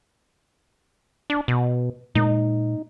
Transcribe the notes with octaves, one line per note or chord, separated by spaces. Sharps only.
D4
B2
A#2 G#3 A#3 D#4